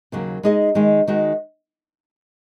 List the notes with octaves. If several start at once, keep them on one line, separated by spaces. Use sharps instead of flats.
D#2 C#3 F#3 A#3
G#3 D#4 G#4 D#5
D#3 G#3 D#4
D#3 G#3 D#4 F#4